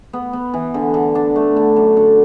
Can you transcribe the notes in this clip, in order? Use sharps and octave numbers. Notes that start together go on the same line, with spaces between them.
B3
B3
E3
D3
D3
D4
A3
D3
F#2
D3